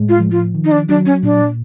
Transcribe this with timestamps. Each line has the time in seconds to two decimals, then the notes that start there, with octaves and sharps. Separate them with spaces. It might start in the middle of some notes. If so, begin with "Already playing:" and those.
Already playing: A2 G#3
0.09 F4
0.20 F3
0.32 F4
0.55 D#3
0.65 D#4
0.72 D4
0.89 F#3 D4
1.06 C#4
1.23 A#2 D4